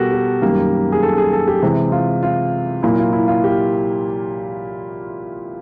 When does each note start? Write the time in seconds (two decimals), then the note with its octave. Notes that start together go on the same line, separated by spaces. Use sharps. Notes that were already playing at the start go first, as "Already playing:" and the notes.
Already playing: B2 G3 B3 F#4 G4 A4 A#4
0.12 G4
0.42 F#2 D#3 G3 A#3
0.92 G#4
1.03 A4
1.18 G#4
1.33 A4
1.48 G4
1.62 C3 E3 G#3 C4
1.92 F4
2.23 F4
2.83 A#2 F#3 A#3 E4
2.99 F4
3.13 E4
3.28 F4
3.44 G4